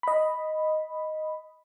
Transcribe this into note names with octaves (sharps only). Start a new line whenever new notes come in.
D#5 B5